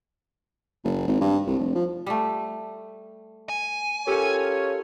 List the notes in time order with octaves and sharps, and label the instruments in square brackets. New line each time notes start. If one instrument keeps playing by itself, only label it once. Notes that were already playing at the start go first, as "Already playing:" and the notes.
[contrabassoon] F#1
G#1
G2
C2
F1
F3
[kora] G3 A3
[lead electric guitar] G#5
[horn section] C#4 F4 C#5 [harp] G4 A4 A#4